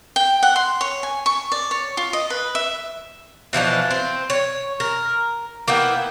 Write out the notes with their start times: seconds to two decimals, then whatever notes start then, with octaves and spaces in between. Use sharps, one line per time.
0.16 G5
0.43 F#5
0.56 C6
0.81 C#5
1.03 G#5
1.26 C#6
1.52 D5
1.71 C#5
1.97 F4
2.13 D#5
2.30 B4
2.55 E5
3.53 B2 E3 F3 D4
3.91 C4
4.30 C#5
4.80 A#4
5.68 A#3 B3 E4 G5